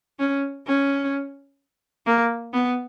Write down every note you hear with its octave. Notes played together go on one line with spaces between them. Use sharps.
C#4
C#4
A#3
B3